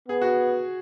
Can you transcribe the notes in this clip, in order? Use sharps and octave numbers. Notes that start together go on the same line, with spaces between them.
B3 G#4
F#4